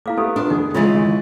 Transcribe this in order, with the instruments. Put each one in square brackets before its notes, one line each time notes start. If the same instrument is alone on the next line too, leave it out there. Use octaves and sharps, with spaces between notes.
[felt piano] A#3 [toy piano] E4 F5 D6
[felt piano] B3 E4 [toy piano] G4 A4
[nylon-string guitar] D4 [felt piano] F4 A#4 B4
[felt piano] F2 B3 G#4 [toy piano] D#4
[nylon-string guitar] C#3 E3 G#3 [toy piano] F4 G#4 E5 [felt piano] C6 A6
[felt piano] G#1